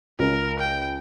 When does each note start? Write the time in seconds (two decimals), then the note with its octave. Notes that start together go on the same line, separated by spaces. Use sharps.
0.19 C#2 A#4
0.59 G5